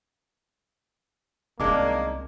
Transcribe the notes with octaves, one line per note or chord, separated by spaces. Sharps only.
C2 D#3 G#3 A#3 C#4 D4 D6